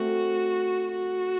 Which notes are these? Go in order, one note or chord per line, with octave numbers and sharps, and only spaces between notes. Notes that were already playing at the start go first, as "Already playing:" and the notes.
Already playing: A3 C4 F#4
F#4